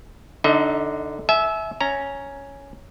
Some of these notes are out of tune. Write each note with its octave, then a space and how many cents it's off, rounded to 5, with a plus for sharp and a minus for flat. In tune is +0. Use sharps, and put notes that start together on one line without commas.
D3 +0 D#4 +0 D#5 +45
E5 -10 G#5 +40
C#4 +0 A#5 -5